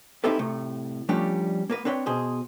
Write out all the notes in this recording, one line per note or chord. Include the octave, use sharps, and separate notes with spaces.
C4 D#4 E4 G4 A4 B4
A2 C3 A3
F3 G3 A3 C#4 D4 G4
A#3 A#4 B4
C4 D4 B4 C#5 G5
B2 G#4 C5